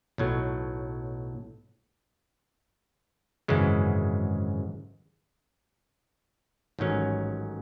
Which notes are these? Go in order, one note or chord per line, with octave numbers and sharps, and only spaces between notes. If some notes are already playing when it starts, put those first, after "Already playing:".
B1 A2 F#3
G#1 F#2 C#3 E3 G#3
A1 G#2 D#3 F#3 C#4